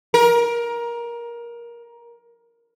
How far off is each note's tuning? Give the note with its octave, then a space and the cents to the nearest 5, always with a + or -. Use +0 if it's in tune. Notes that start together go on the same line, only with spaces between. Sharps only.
A#4 +20